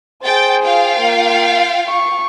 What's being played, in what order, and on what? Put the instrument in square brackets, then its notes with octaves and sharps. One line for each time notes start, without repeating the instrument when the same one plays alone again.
[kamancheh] G#4 C5 [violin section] G5 A6
[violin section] F4 F5 G5
[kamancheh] A#3
C#6